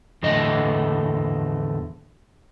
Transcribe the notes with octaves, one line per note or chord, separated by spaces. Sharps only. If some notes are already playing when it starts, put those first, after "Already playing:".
E2 A2 D3 A3 D#5